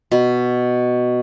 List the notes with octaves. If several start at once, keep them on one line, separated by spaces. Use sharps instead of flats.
B2